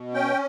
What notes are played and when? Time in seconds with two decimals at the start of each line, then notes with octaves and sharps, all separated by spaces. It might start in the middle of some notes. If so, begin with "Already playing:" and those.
Already playing: B2
0.14 C#4 G5